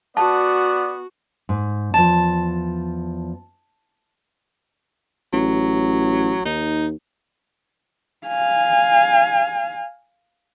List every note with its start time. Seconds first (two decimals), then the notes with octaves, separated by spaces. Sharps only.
0.17 B3 F#4 D5 A5
1.49 G#2
1.94 E2 F3 A5
5.33 A1 F#3
6.45 D#2 D#4
8.27 F5 G#5